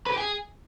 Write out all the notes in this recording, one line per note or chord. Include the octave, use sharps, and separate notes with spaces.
B4
G4
G#4